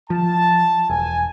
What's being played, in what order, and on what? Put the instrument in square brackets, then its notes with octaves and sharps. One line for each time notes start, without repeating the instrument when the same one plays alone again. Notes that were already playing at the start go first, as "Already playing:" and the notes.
[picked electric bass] F3 [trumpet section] A5
[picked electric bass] E1 [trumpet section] G#5